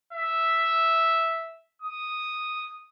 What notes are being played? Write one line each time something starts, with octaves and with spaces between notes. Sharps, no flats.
E5
D#6